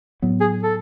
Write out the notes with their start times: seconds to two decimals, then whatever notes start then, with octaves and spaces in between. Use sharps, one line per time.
0.22 A2 F#3 B3
0.40 G#4
0.63 A4